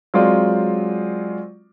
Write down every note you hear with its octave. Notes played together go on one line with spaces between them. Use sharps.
F#3 G#3 C4 F4 D5